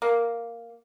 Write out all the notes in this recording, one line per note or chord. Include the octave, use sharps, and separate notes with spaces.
A#3